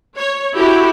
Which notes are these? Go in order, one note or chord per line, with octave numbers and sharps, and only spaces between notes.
C#5
E4 F#4 G4 A4